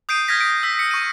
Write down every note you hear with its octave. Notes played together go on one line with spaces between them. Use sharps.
D#6 G6 C7 D7 D#7
F6 G#6 A#6 B6
D7
E6 B6
C#7
C#6 D#7